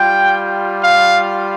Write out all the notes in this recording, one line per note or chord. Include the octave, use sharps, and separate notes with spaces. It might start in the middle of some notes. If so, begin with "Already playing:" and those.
Already playing: G3 F4 G5
F5